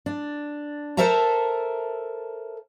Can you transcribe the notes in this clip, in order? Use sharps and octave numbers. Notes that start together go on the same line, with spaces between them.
D4
A4 A#4 C5 E5 A5 A#5